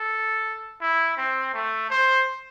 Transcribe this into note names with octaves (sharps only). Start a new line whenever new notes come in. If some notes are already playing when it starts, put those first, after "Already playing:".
Already playing: A4
E4
C4
A3
C5